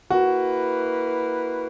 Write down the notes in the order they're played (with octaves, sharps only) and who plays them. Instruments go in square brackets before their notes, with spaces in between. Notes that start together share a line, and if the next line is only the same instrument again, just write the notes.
[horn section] A#3 E4 B4 [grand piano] F#4